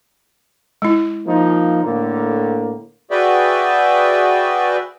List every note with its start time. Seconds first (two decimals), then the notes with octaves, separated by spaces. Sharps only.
0.82 G#3 E4
1.26 F3 A#3 D#4
1.83 A2 D3 A#3
3.11 F#4 G#4 B4 D5 E5 G5